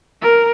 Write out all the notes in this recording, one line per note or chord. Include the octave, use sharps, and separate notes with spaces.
A#4